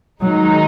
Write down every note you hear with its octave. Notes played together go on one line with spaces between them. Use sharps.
D#3 F#3 G#3 D#4